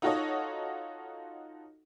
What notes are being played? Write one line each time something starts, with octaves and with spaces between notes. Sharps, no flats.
D#4 F4 F#4 A4 C#5 D#5